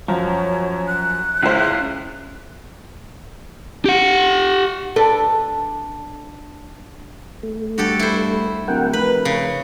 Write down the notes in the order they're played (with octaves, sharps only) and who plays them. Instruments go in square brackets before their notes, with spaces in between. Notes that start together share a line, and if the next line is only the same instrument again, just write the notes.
[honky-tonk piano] F#2 [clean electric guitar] F3 [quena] C#5
[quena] F#6
[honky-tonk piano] C#2 C5 [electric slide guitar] C#4 E4 F4
[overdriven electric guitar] G4 F#5
[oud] D4 A4 B4
[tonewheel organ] A3
[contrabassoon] G2 [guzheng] F#4 G4 A4
[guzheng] E4 C5
[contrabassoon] D1 [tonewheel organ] A#4 F#5 G5
[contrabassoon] F1 [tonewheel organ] A#4 [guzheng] B4
[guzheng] C#3